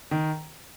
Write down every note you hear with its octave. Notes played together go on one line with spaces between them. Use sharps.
D#3